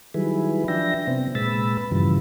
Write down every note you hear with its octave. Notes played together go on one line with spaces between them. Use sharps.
D#3 F#3 G3 E4 G#4 B4
F3 D4 E5 G5 A#6
C3 B3 C4
A#2 G#3 B4 B5 E6 A6
G2 C#3 E3 F3 G3